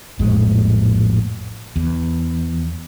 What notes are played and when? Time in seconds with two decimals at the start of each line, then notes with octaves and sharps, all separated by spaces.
0.19 A#1 F2 A2 G#3
1.76 E2